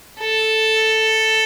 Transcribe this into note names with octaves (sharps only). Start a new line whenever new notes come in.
A4